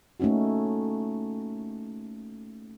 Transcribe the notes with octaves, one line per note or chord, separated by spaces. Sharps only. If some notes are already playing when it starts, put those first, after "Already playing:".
A3 A#3 C#4 D#4 F#4